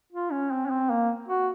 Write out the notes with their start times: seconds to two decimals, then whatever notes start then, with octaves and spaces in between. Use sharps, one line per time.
0.12 F4
0.32 C#4
0.51 C4
0.66 C#4
0.70 C4
0.90 A#3
1.28 F#4